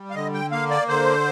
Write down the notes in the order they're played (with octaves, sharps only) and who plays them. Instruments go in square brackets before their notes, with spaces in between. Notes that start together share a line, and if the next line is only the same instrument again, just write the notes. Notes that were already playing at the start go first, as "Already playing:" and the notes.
Already playing: [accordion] G3
F5
D3 D#5
G5
A#3 F5
D5
D3 C5